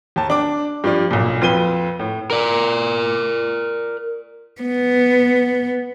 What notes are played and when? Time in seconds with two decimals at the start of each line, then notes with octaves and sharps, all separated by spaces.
0.16 D#2 A5
0.30 D4 D6
0.84 G2 F3 D5
1.11 B1 A#2
1.42 F2 F4 B4 D#7 G7
1.99 A2
2.31 A#4 D5
4.61 B3